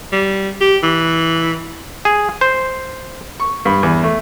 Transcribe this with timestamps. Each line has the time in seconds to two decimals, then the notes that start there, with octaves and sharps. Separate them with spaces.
0.13 G3
0.61 G4
0.83 E3
2.05 G#4
2.41 C5
3.40 C#6
3.65 G2
3.83 E2
4.03 A3